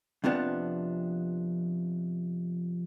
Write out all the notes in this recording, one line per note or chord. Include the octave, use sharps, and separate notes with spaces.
F2 C3 F3 B3 D4